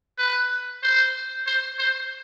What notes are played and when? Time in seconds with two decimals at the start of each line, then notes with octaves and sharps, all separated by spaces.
0.18 B4
0.83 C5
1.47 C5
1.79 C5